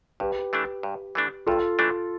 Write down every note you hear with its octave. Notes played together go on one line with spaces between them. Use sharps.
G2 G4 B4
E3 A3 D4
G2
E3 A3 D4
G2 F4 A4
E3 A3 D4